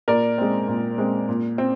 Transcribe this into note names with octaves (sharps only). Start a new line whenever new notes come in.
A#2 A#4 D5
G#3 C4
A#2
G#3 C4
A#2
C4